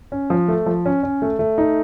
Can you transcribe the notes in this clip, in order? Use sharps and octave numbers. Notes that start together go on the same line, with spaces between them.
C#4
F3
A3
F3
C#4
C#4
A3
A3
D#4